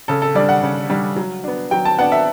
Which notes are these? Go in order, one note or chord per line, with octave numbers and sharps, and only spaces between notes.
C#3 A4
A4
G3 D4 D5
F#5
C#3
G3 D4
F#3
B3 D4
F#3 G5
A5
B3 D4 F#5
E5